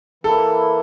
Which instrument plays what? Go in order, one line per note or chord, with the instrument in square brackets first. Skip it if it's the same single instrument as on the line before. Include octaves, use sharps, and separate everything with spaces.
[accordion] E3 A#3 E4 [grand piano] A4